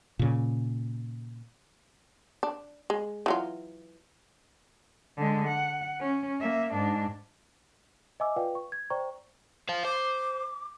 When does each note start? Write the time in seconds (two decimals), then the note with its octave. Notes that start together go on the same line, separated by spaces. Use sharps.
0.19 A#2 C#3
2.43 D4
2.90 G#3
3.26 E3 F#3 F4
5.17 D3 G#3
5.47 F#5
6.00 C#4
6.40 A#3 E5
6.74 G#2 D4
8.20 D#5 E5 G#5 D6 E6
8.36 F4 B4 D5 F5 G5
8.55 C#6
8.72 G#6
8.90 C5 D5 G5 A#5 C#6
9.69 C5 F5
9.85 C5 D6